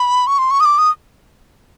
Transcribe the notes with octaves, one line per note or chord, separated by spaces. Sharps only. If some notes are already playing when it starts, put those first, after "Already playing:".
Already playing: B5
C#6
C6
C#6
D#6
D6
D#6